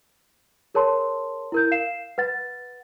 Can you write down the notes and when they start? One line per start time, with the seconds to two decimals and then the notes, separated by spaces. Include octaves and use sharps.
0.75 G#4 A#4 C#5 A5 C6
1.52 E4 A#4 G6
1.72 F5 C7 E7
2.18 B4 F#5 A6